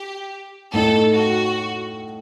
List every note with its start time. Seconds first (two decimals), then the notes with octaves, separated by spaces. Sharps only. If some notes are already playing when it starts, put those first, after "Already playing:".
Already playing: G4
0.72 A2 A3 D#4 A4
1.13 F#4